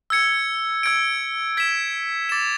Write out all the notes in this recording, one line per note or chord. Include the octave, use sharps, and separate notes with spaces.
E6 G#6 C#7
E6 G#6 D7
G#6 B6 E7
D6 A6 E7